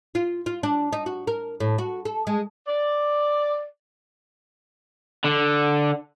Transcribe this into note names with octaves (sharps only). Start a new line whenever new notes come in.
F4
F4
D4
D#4
F#4
A#4
A2
F#4
A4
G#3
D5
D3